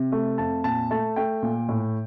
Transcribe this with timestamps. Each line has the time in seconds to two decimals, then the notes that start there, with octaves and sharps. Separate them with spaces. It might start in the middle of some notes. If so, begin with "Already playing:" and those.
Already playing: C3
0.12 A3
0.38 F2 A5
0.64 A#2 A5
0.91 A3 A5
1.16 A3 G5
1.42 A#2
1.69 A2